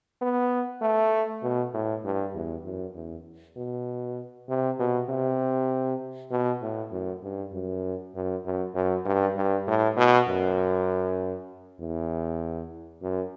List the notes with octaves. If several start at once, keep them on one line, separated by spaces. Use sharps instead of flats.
B3
A3
B2
A2
G2
E2
F#2
E2
B2
C3
B2
C3
B2
A2
F#2
G2
F#2
F#2
F#2
F#2
G2
G2
A2
B2
F#2
E2
F#2